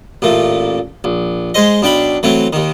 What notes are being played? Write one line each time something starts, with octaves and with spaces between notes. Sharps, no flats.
A1 A#2 A3
A#1
G#3 G#4 C5 D#5
B1 D4 G5 B5
E3 F#3 A3 C4
D#2 D#3